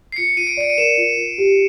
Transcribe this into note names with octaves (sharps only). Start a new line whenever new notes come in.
C7
F4 C#7
F4 D#7
D7
D5 D7
D#7
A#4 E7
F4
F4
G4